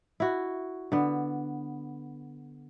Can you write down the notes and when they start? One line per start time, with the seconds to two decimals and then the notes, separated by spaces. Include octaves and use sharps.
0.20 E4 F#4
0.92 D3 B3